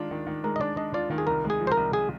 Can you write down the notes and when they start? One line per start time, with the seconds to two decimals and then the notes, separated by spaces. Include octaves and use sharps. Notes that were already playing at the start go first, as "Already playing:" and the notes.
Already playing: D#3 G#3 D4 F4
0.11 D#3
0.26 D#3
0.44 G#3 A#4
0.56 D#5
0.60 D4 D5
0.77 D4 D#5
0.94 F4 D5
1.10 D#3
1.18 G#4
1.27 C2 A#4
1.44 G#3
1.50 G#4
1.60 F3
1.67 C5
1.72 A#4
1.77 C2
1.93 G#4